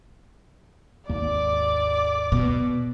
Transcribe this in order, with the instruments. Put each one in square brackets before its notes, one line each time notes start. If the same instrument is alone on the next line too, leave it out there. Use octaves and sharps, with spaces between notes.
[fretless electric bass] G#1 D#2 A#3 [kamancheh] D5 D6
[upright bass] B2